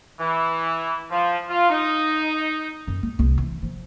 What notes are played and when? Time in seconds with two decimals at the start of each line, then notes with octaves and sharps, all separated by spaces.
0.20 E3
1.10 F3
1.49 F4
1.69 D#4
2.87 F#2
3.03 G#3
3.19 C2
3.38 E3
3.62 F3